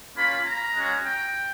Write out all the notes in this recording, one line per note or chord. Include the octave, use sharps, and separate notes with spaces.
A#3 C#4 F4 B5
A#5
G#3 C#4 F#4
G5